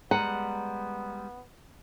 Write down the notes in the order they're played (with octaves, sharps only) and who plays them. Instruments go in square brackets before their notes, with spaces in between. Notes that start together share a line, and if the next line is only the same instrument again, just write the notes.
[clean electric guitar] G3 G#3 [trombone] B3 [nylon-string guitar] F#5 [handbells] A#5